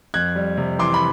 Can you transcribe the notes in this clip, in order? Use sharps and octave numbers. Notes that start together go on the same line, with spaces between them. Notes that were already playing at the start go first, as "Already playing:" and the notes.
F2 F#6 G#6
G3
C3
E3 C6 D6
B5